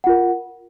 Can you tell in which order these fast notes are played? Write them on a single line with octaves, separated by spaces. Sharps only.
F#5 F4 A#4